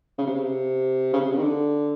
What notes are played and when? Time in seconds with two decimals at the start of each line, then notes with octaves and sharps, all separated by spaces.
0.18 C#3
0.27 C3
0.35 C#3
0.43 C3
1.13 C#3
1.21 C3
1.32 C#3
1.38 D#3
1.43 D3